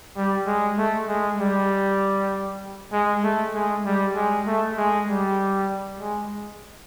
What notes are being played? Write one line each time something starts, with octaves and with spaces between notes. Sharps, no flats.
G3
G#3
A3
G#3
G3
G#3
A3
G#3
G3
G#3
A3
G#3
G3
G#3